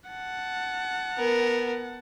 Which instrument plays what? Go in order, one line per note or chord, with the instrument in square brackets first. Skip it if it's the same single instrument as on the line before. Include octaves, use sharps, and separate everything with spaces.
[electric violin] F#5 A5
[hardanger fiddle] B3 A#4